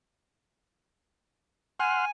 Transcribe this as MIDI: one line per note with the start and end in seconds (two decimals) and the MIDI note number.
1.80 2.05 78
1.80 2.11 80
1.80 2.05 84
1.80 2.05 89